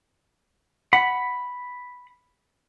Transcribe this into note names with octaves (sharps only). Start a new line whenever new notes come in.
F#5 B5